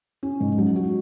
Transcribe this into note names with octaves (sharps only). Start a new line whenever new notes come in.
C#4
G#2
F#3
F#4